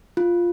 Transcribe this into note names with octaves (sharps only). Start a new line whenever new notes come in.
F4